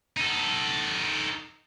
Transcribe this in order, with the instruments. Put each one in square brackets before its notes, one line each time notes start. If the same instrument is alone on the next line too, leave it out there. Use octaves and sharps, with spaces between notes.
[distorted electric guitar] D#4 A4